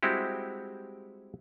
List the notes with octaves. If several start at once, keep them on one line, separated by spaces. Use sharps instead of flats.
G3 G#3 C4 E4 F#4 G4